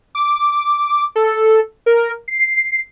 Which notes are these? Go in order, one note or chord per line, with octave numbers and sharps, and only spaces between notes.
D6
A4
A#4
C7